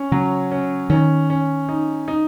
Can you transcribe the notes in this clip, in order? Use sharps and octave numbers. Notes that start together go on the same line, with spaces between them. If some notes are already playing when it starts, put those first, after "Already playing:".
Already playing: C#4
C#3 F#3
C#4
D#3 C#4
C#4
D#4
D#4